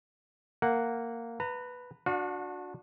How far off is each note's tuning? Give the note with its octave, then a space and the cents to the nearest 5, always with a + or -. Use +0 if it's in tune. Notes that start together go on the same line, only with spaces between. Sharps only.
A#3 -10 F#5 +0
B4 +0 A#5 -30
D4 +0 F#4 -30 F5 +45